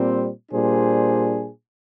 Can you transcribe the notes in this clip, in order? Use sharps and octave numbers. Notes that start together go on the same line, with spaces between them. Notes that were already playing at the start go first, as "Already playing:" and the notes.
Already playing: A#2 G3 C4
A#2 G3 D4 G#4 C5